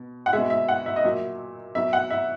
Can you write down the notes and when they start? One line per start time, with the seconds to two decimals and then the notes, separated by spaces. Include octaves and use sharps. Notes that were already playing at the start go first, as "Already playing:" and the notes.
Already playing: B2
0.26 F#5
0.33 B2 G#3 E5
0.50 E5
0.68 F#5
0.86 E5
0.96 D#5
1.04 A#2 F#3 E5
1.75 B2 F#3 E5
1.93 F#5
2.10 E5